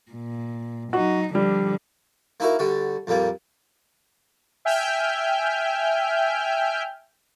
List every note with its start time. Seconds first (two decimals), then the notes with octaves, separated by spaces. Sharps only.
0.11 A#2
0.93 F#3 D#4 F#4
1.35 D3 F3 G3
2.40 A#3 D#4 E4 F#4 A#4
2.59 D3 G3 F#4
3.07 F2 A#2 G3 A#3
4.65 E5 G5 G#5 F6 G6